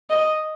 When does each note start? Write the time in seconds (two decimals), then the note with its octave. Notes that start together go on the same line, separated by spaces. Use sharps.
0.10 D#5